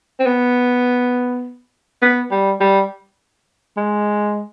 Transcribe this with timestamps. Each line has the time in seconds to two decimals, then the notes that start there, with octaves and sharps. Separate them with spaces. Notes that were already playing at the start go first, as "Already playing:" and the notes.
0.20 C4
0.26 B3
2.02 B3
2.31 G3
2.60 G3
3.77 G#3